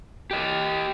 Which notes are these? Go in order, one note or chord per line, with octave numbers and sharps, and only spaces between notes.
G4 D#5